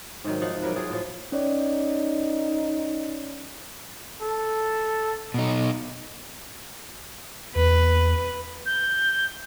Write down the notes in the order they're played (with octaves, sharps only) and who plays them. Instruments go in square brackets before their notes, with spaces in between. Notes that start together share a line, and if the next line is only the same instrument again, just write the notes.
[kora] G#2 C3 D#3 F#3
F3 D#4 F#5
C3 F#3 A#4 B4
F#3 F4 G#4
A2 F3
[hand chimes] C#4 C#5 D5 [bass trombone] D#4
[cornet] A4
[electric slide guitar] B2 D#4
[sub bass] E2 [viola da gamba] B4
[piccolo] G6